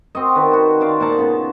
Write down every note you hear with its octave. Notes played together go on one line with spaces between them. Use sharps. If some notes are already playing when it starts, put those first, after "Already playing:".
C4 F#4 D#5
D#3 B4 D5
F#4 C5
C5 D5 F5
A#2 D#4 F#5 A5
C#3 B3 F4